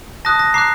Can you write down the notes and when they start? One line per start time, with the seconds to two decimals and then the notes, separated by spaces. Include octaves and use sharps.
0.25 A5 D#6 F#6 A#6
0.39 A#6
0.54 A#5 D6 F#6 C7